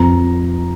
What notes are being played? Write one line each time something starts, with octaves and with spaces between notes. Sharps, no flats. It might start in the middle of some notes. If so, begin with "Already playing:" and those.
Already playing: F2 A#5